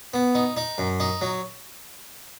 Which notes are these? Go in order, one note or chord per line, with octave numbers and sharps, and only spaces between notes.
B3
D#4
D#4
F#2
D#4
F#3